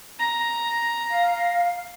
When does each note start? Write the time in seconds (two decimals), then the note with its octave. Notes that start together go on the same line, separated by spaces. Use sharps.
0.19 A#5
1.10 F5